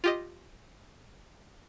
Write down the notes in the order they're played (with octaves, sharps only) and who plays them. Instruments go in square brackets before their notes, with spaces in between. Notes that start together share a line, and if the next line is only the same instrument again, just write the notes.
[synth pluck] F4 G4 D#5